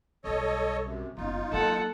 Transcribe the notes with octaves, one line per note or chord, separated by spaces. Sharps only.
B1 G3 A4 C#5 D#5
F#2 C3
F#1 B3 D#4 F4
F#3 A#3 A4 F#5